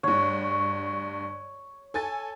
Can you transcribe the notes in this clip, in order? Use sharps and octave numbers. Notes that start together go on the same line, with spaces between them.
D2 G2 C#5
A4 G#5 A6